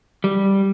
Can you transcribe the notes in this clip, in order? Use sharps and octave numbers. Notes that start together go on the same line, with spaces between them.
G3